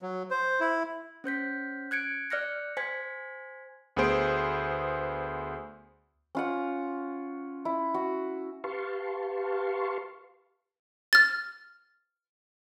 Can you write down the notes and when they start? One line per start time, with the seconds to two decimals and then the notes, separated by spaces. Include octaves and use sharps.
0.02 F#3
0.30 C5
0.60 E4
1.24 C#4 C5 G6 B6
1.91 F#6 G#6 C#7 D7
2.30 D5 F6 F#6 A#6 C#7
2.77 C5 G#5 G#6 B6
3.97 D2 B3 G#4 C5 D7
6.35 C#4 F4 F#5
7.65 E4
7.94 F#4
8.64 G4 B4 F5 A5 C6 C#6
11.13 F6 A6